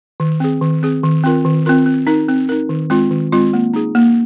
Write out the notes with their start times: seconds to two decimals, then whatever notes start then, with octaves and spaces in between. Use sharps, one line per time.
0.20 D#3
0.40 C4 G#4
0.61 D#3
0.83 C4 G#4
1.03 D#3
1.23 C4 F4 A#4
1.45 D#3
1.66 C4 F4 A#4
1.86 C4
2.07 D#4 A#4
2.29 C4
2.49 D#4 A#4
2.69 D#3
2.90 G#3 C4 F4
3.11 D#3
3.33 G#3 C4 F4
3.53 A#3
3.74 D#4 G#4
3.95 A#3